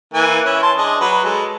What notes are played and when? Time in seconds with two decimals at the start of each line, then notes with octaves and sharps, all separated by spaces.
0.13 E3 A#3 G#5
0.45 C#4 E4
0.62 A5 C6
0.78 D4 G#4 D#5
1.00 F#3 B4
1.24 G#3 A4